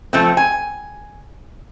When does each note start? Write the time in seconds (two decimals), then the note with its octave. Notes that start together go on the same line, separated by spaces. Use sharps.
0.13 F3 A3 C4
0.37 G#5